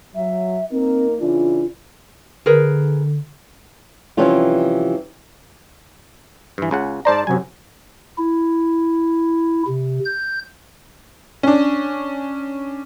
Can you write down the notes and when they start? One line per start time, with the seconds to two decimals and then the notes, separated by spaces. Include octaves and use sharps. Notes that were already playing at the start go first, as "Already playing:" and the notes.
0.15 F#3 E5
0.71 A#3 C4 D#4 A#4
1.20 C#3 E3 D4 F4
2.46 D3 G#4 A#4 B4
4.17 C3 E3 F3 G3 C#4 F4
6.58 G2 E3
6.71 C#2 C#3 F#5
7.05 G#2 C5 D5 A5 A#5
7.27 F#2 C3 F#3 G#5
8.18 E4
9.67 C3
10.05 G6
11.43 C#4 D4